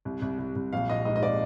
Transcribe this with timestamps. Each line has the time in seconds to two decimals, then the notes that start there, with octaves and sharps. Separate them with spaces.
0.05 C2
0.22 C2
0.39 C2
0.56 C2
0.73 A#1 F5
0.89 A#1 D#5
1.05 G#2 D#5
1.16 D#5
1.23 D5